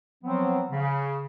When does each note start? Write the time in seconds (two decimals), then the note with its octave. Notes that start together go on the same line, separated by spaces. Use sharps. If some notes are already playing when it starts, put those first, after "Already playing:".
0.23 F3 F#3 B3 C4
0.71 C#3